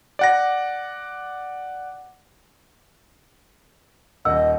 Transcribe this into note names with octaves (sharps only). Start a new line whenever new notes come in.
D5 F#5 A#6
D#1 D#5 F#5 E6